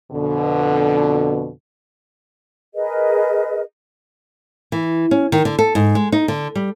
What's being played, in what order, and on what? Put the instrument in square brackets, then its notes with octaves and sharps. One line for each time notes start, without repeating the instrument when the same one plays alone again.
[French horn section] F2 B2 D3
[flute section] G#4 A#4 B4 D#5
[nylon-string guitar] E3
C#4
D#3
D3
A4
G#2
G#3
D#4
D3
G3